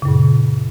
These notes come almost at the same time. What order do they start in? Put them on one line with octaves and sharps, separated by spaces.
C#3 F#2 A#2